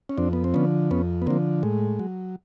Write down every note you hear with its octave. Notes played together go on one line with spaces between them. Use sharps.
C#4
F2 C4 D4
B3
C4
D3 F3 B3 C#4
F2 B3 C#4
B3
D3 F3 A#3 C4
A2 G#3
F#3